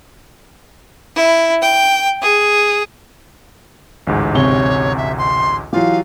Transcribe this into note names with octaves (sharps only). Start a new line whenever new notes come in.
E4
G5
G#4
A1 D2 G#2
C3 C#5 C#6 G7
E5
C6
E3 F#3 F4 G4 F5